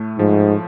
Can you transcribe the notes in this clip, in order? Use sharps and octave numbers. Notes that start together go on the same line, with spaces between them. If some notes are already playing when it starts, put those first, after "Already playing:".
Already playing: A2 A3
G#2 F3